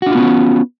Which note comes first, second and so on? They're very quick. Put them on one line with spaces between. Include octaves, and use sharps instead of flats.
F#4 D4 F4 B3 C#4